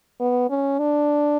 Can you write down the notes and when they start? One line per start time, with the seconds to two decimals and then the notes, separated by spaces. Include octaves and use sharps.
0.20 B3
0.50 C#4
0.79 D4